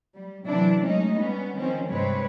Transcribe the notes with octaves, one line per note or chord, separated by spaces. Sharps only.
G3
C3 E3 F#3 D4 E4
F#3 G#3 A3 C#4 D#4
G3 B3 C#4
D#3 F3 C4 C#4
G2 C3 G#3 C4 B4 C#5